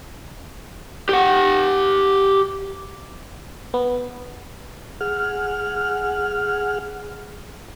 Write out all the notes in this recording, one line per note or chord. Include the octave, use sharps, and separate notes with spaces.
G4 F#5
B3
G#4 F#5 F6